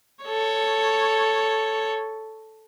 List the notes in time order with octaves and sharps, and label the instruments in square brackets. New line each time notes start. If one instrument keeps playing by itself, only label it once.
[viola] A4 C#5